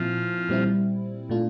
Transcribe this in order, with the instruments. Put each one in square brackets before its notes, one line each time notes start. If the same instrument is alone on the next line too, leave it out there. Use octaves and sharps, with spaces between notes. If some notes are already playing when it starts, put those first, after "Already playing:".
Already playing: [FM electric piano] A#2 C4 E4 [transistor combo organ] F3
[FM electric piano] A#2 G3 C4 E4
A#2 A3 D4 F4